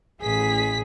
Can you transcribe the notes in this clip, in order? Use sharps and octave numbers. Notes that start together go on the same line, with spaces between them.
A1 G#4 B6